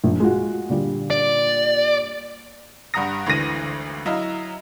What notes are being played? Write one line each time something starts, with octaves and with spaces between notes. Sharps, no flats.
A#1
G#3 F4 F#4
A#2 D3 G3
D5
G2 G3 F#5 A#5 D#6 A#6
G#1 D2 D3 E3 A#6 D#7
F#3 E4 D#5 F5 A#5